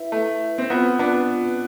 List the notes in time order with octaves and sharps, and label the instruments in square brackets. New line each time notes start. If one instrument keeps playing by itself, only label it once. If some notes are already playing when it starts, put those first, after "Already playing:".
Already playing: [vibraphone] E4 B4 E5
[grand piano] A3
C4
[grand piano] B3 [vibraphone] C4 F4 B4
[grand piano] B3 D4